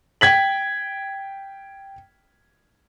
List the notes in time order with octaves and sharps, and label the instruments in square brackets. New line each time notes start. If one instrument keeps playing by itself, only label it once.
[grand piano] G5 G#6 B6 F#7